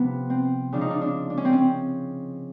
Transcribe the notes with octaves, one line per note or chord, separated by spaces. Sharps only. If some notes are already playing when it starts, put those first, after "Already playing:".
Already playing: C3 F3 B3
C4
C#3 F3 D4
D#4
D4
D4
D4
C#4
C4
C#4